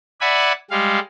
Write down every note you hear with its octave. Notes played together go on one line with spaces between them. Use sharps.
D5 E5 F#5 G#5 B5
G3 G#3 F5